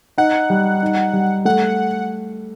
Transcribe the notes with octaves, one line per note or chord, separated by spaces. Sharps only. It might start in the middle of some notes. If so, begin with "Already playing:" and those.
D#4 F#5
G3
D#4
G3
A3 F#5